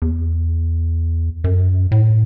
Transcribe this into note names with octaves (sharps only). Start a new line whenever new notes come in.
E2
F#2
A2